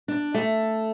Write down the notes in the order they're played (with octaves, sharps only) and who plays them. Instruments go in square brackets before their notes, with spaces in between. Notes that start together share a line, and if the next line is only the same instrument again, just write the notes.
[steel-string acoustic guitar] D4
A3